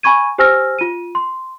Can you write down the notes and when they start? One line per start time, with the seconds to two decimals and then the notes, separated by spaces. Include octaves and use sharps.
0.03 G#5 B5 C#6 G#6 D#7
0.38 G4 C5 G#5 E6 F6 A#6
0.79 F4 D#7
1.15 C6